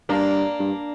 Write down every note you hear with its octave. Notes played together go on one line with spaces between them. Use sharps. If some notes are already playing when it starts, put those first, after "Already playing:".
G2 A#3 D4
G2